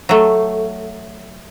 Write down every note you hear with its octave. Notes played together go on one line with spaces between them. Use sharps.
F#3 A3